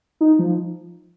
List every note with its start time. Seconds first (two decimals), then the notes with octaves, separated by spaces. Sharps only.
0.21 D#4
0.39 F3